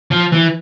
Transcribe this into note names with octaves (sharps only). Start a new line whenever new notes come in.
F3
E3